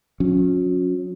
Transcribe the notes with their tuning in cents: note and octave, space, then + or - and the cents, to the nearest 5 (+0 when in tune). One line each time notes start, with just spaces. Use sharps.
F#3 -40 C#4 +0